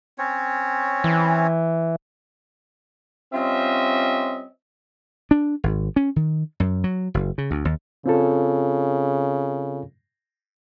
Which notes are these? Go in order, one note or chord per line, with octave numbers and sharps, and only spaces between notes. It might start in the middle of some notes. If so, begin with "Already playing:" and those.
C4 C#4 C#5
E3
G3 C4 C#4 F4 D#5 E5
D4
G#1
C#4
D#3
F#2
F#3
F#1
C#3
D2
D#2
C#3 C4 F4 A4